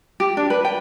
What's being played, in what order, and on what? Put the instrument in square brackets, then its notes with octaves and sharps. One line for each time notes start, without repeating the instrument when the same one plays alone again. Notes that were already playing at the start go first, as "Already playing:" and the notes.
[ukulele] G4
D4
B4
G5